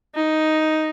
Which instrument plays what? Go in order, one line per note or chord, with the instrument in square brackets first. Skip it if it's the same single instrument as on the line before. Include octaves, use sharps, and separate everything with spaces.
[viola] D#4